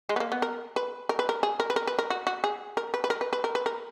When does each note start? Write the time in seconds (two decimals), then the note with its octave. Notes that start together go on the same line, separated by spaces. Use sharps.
0.09 G#3
0.16 B3
0.20 A#3
0.32 B3
0.42 A#4
0.76 B4
1.09 A#4
1.19 B4
1.29 A#4
1.43 G#4
1.60 A#4
1.70 B4
1.76 A#4
1.87 B4
1.99 A#4
2.10 F#4
2.27 F#4
2.44 G#4
2.77 A#4
2.94 B4
3.04 B4
3.10 A#4
3.21 B4
3.33 B4
3.44 A#4
3.55 B4
3.66 A#4